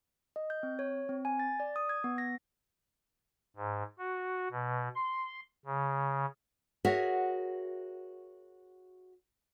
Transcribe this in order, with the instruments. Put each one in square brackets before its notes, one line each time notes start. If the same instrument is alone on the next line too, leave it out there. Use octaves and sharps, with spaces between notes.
[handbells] D#5
G6
C4
C#5
C4
G#5
A6
D5
D#6
G#6
B3
A#6
[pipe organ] G#2
F#4
B2
C6
C#3
[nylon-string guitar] F#4 G#4 A#4 C#5 E5 F#5